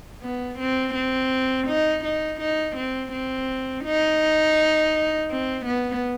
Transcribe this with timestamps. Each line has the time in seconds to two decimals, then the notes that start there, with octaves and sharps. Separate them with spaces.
0.22 B3
0.59 C4
0.95 C4
1.67 D#4
2.04 D#4
2.40 D#4
2.76 C4
3.12 C4
3.84 D#4
5.30 C4
5.65 B3